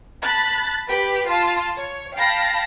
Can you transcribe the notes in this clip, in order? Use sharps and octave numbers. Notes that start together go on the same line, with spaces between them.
A5 B5 F#6 A6
G4 B4
F4 A5
C#5
F5 G5 A5 B5 A#6